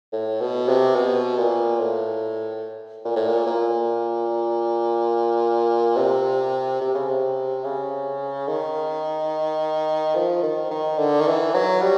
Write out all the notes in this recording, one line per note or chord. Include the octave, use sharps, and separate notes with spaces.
A2
B2
C3
B2
A#2
A2
A#2
A2
A#2
A#2
C3
C3
C#3
C3
C#3
D#3
F3
D#3
D#3
D3
D#3
E3
F#3
G3